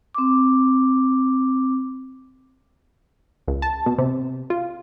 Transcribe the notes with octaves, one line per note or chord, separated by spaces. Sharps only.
C4 D6
C#2
A5
B2
C3
F4